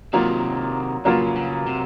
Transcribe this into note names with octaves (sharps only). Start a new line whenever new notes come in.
C3 D#3 F#3 A#3 F4
C#3 F#3 A#3 F4
C#3
C3